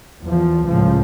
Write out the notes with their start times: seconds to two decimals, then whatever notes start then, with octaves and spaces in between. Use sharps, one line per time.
0.22 E2 F3
0.68 C#2 A2 F3